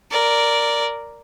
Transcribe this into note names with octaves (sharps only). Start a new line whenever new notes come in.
A#4 D5